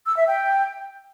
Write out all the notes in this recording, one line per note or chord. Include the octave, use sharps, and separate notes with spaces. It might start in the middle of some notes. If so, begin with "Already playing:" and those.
E6
E5
G5